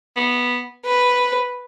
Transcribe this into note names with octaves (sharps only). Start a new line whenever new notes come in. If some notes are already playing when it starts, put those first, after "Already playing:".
B3
B4